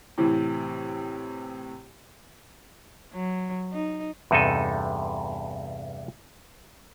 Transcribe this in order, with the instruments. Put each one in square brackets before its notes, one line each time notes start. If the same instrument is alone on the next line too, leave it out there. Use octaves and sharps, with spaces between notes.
[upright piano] A2 C3 E3
[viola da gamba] F#3
D#4
[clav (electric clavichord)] E2 G2 C3 D#4 A4 G#5